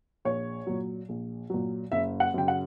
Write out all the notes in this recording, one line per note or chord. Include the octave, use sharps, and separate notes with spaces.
A#1 C#5
A#2 F#3
A#1
A#2 F#3
F#1 E5
F#5
F#2 C#3 G5
F#5